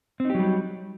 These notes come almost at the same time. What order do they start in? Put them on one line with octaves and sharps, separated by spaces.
C4 D#4 G4 F#3 G3